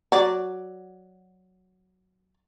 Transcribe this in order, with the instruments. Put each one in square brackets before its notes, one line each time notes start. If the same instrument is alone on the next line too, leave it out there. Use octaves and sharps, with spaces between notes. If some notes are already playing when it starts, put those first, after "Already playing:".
[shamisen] F#3 D5